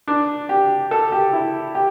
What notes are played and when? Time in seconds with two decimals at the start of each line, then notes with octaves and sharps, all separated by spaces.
0.08 D4
0.49 G4
0.91 A4
1.12 G4
1.33 E4
1.75 G4